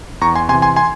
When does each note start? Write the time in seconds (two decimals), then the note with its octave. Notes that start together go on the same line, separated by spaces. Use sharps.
0.21 E2 A#5 C#6
0.35 G#5 C6
0.49 C3 G#5 C6
0.54 E3
0.62 G#5 C6
0.76 G#5 C6